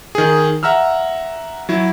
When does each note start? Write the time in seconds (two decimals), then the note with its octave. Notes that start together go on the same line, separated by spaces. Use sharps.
0.15 D#3 G#4
0.63 E5 F#5 A#5 E6 F6
1.69 F#3 E4